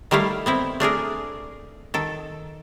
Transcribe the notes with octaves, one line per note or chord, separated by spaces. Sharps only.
D#3 G3 A3 E4 F5
B3 C4 E4
A3 D4 G#4 A#4
D#3 A4